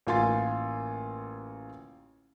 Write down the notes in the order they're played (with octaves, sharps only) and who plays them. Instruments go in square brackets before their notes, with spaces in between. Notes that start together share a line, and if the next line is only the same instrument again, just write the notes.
[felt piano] A1 A#3 F4 G#5 C6 A6